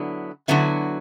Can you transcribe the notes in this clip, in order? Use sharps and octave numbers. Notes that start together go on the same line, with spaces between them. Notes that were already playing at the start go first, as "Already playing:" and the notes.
Already playing: D3 F#3 B3 E4
D3 F#3 B3 E4 F#4